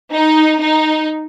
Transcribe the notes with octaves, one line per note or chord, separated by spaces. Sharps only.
D#4
D#4